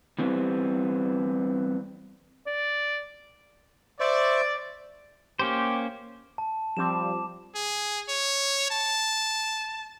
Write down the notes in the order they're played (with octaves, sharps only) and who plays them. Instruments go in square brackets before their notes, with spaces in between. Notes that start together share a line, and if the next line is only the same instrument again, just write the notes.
[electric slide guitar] E3 G3 B3 C4
[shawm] D5
[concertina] C5 E5 C#6 [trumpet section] D5
[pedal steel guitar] A#3 C#4 C5 [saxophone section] G4
[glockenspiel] A5
[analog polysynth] F3 G3 C4 [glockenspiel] D6 E7
[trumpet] G#4
C#5
A5